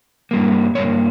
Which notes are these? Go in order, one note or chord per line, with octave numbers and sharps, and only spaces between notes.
G2 G3 A#3
G2 G3 A#3 C#5